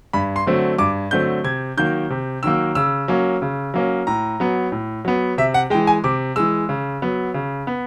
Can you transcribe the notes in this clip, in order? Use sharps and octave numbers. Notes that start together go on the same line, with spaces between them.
G2 B5
C6
D3 F#3 A3 C4
G2 D6
D3 F#3 A3 C4 G6
C3 G#6
D#3 F#3 A#3 G6
C3
D#3 F#3 A#3 E6
C#3 E6
F#3 A#3 C#4
C#3
F#3 A#3 C#4
A2 A#5
F#3 B3
A2
F#3 B3
C3 E5
F#5
E3 G#3 G5
G#5
C3 D6
E3 G#3 E6
C#3
F#3 B3
C#3
B3